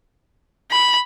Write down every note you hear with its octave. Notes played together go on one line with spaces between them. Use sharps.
B5